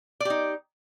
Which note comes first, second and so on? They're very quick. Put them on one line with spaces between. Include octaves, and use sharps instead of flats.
D5 G4 D#4